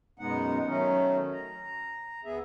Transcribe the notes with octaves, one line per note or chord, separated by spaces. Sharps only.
F#2 B2 G#3 B3 D#4 F#5
D#3 F#3 A3 C#4 D#4
A#5
D2 B3 G#4 E5